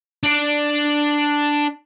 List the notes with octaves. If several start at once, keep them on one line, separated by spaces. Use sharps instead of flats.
D4 D5